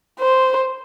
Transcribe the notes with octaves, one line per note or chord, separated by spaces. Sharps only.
C5